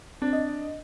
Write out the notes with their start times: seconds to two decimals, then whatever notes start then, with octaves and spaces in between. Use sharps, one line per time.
0.22 C4 D4
0.33 D#5